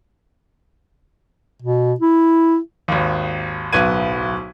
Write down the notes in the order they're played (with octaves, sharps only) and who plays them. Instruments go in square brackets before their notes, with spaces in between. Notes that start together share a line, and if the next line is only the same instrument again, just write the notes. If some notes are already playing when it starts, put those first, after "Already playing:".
[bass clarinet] B2
E4
[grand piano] G#1 D#2
D1 B1 B3 B4 G#6 D#7